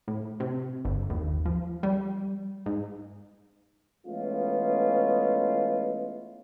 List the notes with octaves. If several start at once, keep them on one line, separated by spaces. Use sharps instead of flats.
A2
C3
G1
D#2
F3
G3
G#2
E3 G#3 A3 B3 C#4 F4